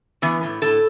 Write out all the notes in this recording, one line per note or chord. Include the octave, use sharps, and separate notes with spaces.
E3 B3
A2
A2 A4